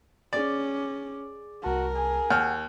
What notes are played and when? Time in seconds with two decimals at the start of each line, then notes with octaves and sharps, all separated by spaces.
0.33 C#4 G#4 D5 D6
1.64 C2 F#4 A#4 A5
1.95 G#4
2.30 D#2 F#5 F6